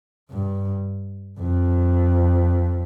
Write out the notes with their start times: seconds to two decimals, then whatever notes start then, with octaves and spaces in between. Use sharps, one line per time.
0.30 G2
1.40 F2